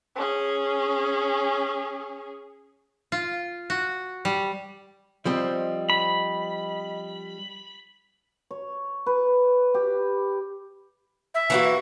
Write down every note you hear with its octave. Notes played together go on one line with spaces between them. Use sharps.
C#4 G#4
F4
F#4
G3
F3 G3 C4 D#5
B5
C#5
B4
G4
E5
E3 A#3 F#4